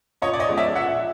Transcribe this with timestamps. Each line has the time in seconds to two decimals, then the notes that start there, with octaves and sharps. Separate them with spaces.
0.22 A#2 C#5 D#5
0.34 D5
0.39 C#5 D#5
0.49 F3 G#3 B3
0.58 D5 E5
0.75 A#2 E5 F#5